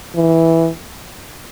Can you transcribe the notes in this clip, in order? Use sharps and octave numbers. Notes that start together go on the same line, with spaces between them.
E3